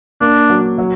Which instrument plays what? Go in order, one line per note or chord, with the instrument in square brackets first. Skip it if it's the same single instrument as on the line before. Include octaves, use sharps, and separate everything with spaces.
[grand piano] A#3 [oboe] D4
[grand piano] F#3
F#3